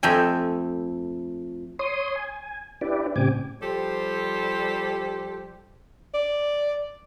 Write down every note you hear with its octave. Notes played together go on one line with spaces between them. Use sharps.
F2 A3 G5 G#5
C#5 C6 D#6
G#5
D4 E4 G4 B4 D5
A2 C#3 C4 G4 G#5 D6
F3 G3 G4 A4 C5
D5